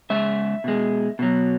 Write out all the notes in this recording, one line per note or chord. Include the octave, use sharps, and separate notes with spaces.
C#3 G#3 E5
B2 G#3
B2 F#3